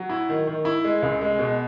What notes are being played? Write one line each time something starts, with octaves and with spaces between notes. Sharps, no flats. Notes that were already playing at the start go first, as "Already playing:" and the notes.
Already playing: F#3
E4
D#3
D#3
E4
G#3
C#2
G#3
B2